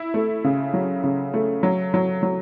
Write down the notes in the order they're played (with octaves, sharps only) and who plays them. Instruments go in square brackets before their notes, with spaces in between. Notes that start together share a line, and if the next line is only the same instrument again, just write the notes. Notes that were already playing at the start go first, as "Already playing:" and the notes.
Already playing: [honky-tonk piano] E4
A3
C#3
F#3
C#3
A3
F#3
F#3
F#3